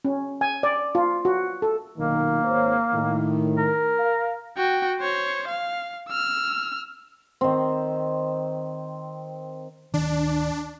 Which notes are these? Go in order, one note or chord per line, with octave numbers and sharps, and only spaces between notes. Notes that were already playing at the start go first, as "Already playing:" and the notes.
C#4
G#5
D5
F4
F#4
A4
B1 A#2 D#3 A#3
G#1 C5 C#5
A2 D#3
A#4
F5
F#4 G5
C5 C#5
F5
E6 F6
D#3 C4
D1 D#3 D4